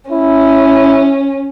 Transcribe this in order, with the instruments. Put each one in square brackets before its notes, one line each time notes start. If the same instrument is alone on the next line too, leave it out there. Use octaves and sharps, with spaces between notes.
[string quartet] C#4 [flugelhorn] E4